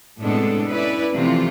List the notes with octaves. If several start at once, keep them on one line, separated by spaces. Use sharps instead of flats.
A2 C3 G#3 B3 D4 A4
C#4 E4 B4 D5
C3 E3 F3 A3 C4 F4